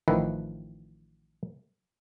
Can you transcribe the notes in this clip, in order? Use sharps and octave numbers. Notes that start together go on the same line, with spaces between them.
A1 D#3 F3 E4 B4